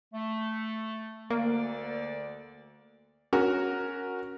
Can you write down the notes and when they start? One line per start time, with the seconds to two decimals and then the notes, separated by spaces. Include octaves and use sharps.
0.13 A3
1.30 D2 D3 A#3 D5
3.33 C#4 F#4 A#4